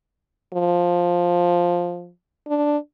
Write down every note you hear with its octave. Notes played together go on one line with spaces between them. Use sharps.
F3
D4